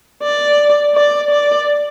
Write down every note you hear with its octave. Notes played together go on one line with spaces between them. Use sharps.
D5
D5
D5